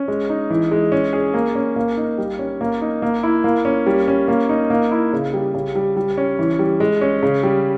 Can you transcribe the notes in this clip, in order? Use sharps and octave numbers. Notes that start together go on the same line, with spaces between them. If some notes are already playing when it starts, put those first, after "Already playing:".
Already playing: C#4
G#3
D#4
E3
G#3
C#4
G#4
A#3
C#4
A#3
D#4
G3
C#4
A#3
D#4
A#3
E4
A#3
C#4
G3
C#4
A#3
D#4
A#3
E4
C#3
G3
C#3
G3
G3
C#4
E3
G3
G#3
C#4
C#3
G3